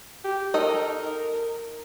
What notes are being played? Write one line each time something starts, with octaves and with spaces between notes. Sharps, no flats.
G4
D#4 A4 A#4 D#5